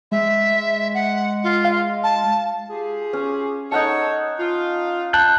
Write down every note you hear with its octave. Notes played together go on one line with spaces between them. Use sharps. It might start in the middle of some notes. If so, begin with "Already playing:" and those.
G#3 E5
F#5
F4
F5
A5
F4 G4 G#4
C#4
D#4 A4 C#5 F#5 A5
F4
A5 F#6 G6